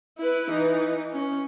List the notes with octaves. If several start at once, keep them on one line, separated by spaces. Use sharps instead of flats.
E4 B4
E3 D#4
C#4